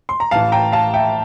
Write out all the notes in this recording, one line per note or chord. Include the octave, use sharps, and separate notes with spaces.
C6
A#5
A1 A2 E3 F5 A5
G5 A#5
F5 A5
E5 G5